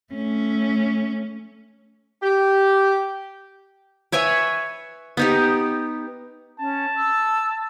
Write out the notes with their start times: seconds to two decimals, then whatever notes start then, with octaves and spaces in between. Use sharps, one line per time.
0.13 A3 C#4
2.23 G4
4.12 B4 C#5 E5 G#5
5.17 B3 D#4 G4
6.60 C#4 A5
6.96 E6